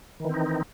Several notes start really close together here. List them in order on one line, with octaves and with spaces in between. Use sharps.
D#3 E3 C4 D#4